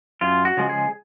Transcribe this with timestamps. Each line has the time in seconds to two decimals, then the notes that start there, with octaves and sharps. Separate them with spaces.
0.21 F#2 F4
0.45 F#4
0.57 C#3 F3 G#3
0.69 G#4